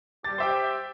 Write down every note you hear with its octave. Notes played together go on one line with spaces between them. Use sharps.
G3 G4 A6
G4 C5 E5 G5